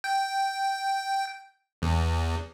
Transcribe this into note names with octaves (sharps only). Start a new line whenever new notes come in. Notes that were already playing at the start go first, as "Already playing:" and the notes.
G5
E2